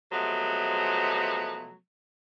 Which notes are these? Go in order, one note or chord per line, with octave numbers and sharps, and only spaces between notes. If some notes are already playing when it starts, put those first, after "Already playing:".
C3 F3 F#3 G#3 A3 B3